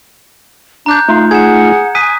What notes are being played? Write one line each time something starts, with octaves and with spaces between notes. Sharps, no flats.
D4 A#5 F#6 G6
A3 D#4 F4 F5
G#4 F#5 G#6 E7
G#5 D#6 F#6 B6